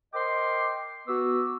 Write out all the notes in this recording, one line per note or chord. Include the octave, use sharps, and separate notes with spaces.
A#4 C5 D#5 G5 C6 D6
B3 F#4 B4 D6 E6